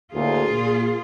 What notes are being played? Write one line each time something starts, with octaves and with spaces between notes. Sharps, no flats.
D2 A2 A#3 F4 G#4
A#2